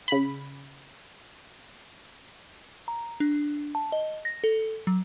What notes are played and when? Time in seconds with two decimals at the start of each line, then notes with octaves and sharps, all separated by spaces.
0.08 C#3 B5
2.88 A#5
3.20 D4
3.75 A5
3.92 D#5
4.25 A#6
4.44 A4
4.87 F#3